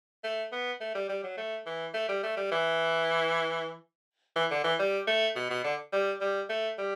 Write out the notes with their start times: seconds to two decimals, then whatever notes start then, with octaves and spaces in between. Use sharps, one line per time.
0.24 A3
0.52 B3
0.81 A3
0.95 G3
1.09 G3
1.24 F#3
1.37 A3
1.66 E3
1.94 A3
2.09 G3
2.23 A3
2.37 G3
2.51 E3
4.36 E3
4.51 D3
4.64 E3
4.79 G3
5.08 A3
5.36 B2
5.50 B2
5.64 D3
5.93 G3
6.21 G3
6.49 A3
6.78 G3